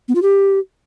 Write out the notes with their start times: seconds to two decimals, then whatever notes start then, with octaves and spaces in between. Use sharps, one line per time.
0.08 B3
0.15 F4
0.22 G4